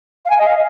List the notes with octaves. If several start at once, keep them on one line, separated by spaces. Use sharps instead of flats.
F5
G#5
D#5
F5